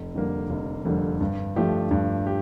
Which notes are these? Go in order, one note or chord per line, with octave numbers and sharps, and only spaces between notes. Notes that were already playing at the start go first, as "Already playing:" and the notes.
Already playing: F1
F2 D3 G3 A#3
F1
F2 D3 G3 A#3
G2
F3 A3 D4 G4
G2
G4